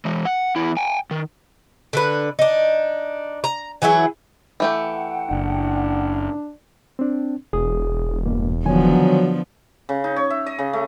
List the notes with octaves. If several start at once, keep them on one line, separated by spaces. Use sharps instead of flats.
E3 G#3
F#5
E2 E4
G5 G#5
D#3
D3 D4 B4
D4 D#4
A#5
E3 F#3 E4 G#4
E3 A3 G4 F#5 G5
F#1 D4
C4 D4
E1 G#4 D#6
G2 B2 A#3
D3 D#3 F3 F#3 B3 G#5
C#3
D#4
C#5
E5
D#5
C#3
A3